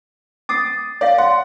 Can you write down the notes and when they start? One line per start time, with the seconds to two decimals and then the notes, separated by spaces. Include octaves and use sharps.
0.49 D6 D#6 A6 C7
1.01 C#5 D5 F5
1.18 F#5 C6